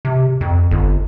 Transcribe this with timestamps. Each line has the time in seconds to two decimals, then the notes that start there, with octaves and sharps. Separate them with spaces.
0.05 C3
0.41 F2
0.71 G1